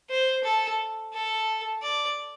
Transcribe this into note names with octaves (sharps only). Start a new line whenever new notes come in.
C5
A4
A4
D5